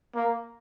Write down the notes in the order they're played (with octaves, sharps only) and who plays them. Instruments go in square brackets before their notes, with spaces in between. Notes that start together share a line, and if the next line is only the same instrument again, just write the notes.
[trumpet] A#3